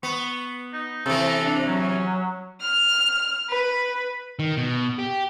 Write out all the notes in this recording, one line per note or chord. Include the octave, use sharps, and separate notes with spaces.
B3 C#6
D#4
C3 E3 A4
D4
F#3 C#4
F6
B4
D#3
B2
G4